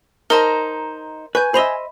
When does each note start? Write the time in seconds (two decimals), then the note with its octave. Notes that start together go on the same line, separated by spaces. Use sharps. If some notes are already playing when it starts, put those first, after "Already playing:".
0.30 D#4 A#4 C5 A5 A#5
1.35 B4 G#5 C#6 G6
1.54 C5 D#5 E5 B5 F7 G7